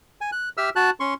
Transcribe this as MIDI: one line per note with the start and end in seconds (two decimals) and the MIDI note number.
0.21 0.31 80
0.32 0.49 90
0.57 0.70 67
0.57 0.70 76
0.57 0.70 88
0.57 0.70 89
0.76 0.90 66
0.76 0.90 81
0.76 0.90 90
1.00 1.14 61
1.00 1.14 84
1.00 1.14 85